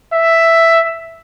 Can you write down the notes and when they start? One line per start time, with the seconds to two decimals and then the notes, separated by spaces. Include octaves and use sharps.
0.13 E5